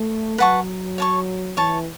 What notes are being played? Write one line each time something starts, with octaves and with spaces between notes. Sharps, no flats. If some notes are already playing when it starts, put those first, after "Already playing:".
Already playing: A3
F#3 B4 F#5 A5 C#6
C#5 A5 C#6
E3 C#5 A5 C#6